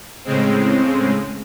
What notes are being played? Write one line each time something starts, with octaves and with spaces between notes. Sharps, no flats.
A2 C#3 G#3 C4